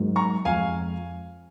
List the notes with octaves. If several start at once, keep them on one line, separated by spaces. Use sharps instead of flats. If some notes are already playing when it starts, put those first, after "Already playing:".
Already playing: G#2 F#3 A#3
A#5 C#6
F2 F3 G#3 F5 G#5